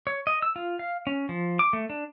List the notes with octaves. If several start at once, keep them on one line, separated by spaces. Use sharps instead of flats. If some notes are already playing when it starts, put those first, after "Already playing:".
C#5
D#5
E6
F4
F5
C#4
F3
D6
A3
D4